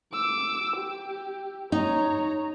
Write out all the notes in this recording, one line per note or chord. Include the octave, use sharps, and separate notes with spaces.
D6 E6
G4
D#4 C#5 A#5